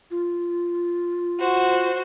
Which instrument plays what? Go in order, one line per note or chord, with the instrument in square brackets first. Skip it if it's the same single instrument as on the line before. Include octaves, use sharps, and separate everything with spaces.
[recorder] F4
[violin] F#4 C5